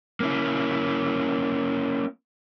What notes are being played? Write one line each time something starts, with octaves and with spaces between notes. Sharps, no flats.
A#3 C#4 E4